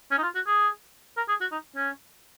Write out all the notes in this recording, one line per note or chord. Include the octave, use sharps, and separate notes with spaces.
C#4
D#4
F4
F#4
G#4
A#4
G#4
F#4
D#4
C#4